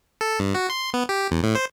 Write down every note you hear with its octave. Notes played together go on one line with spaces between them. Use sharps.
A4
G2
F#4
C6
B3
G4
E2
A2
C5